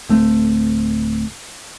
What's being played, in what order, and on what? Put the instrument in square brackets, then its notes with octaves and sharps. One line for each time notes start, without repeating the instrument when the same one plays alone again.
[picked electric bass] D1 A3 C4